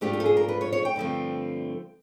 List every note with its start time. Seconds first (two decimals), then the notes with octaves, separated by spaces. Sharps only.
0.01 G#2 F3 A3 D4 F4 G4
0.13 G4
0.20 A4
0.26 G#4
0.37 A#4
0.48 B4
0.61 C#5
0.73 C#5
0.85 G5
0.96 G2 D3 F3 A3 C4